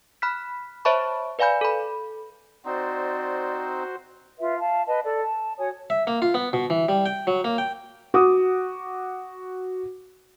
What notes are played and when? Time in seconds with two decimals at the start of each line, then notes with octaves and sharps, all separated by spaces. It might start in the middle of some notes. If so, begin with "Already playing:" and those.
0.22 B5 F6 F#6 B6
0.85 C5 C#5 E5 A5 B5 C#6
1.39 B4 D5 F5 G#5 B5 G6
1.61 A4 B5
2.65 C4 D#4 F#4 C5 D5
4.39 F4 B4 E5
4.58 F5 A5
4.86 B4 D#5 A5
5.03 A4 D5
5.22 A5
5.58 F#4 C#5 G#5 D#6
5.90 E5
6.07 A#3
6.22 F4
6.34 B3
6.53 B2
6.70 E3
6.89 G3
7.06 G5
7.27 F#3
7.44 A#3
7.58 G5
8.14 F#4 D6 D#6